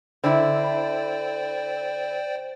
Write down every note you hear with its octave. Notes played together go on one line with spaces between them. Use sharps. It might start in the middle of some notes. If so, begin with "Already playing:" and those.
D3 E4 C5 D5 G5